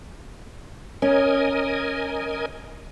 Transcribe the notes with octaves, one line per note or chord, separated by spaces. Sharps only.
C#4 A#4 D#5 G#5